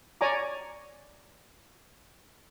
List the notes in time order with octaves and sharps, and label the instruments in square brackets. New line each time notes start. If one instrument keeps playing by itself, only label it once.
[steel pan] C#5 D5 G#5 A#5 D6